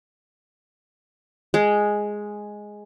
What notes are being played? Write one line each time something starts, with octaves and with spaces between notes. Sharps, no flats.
G#3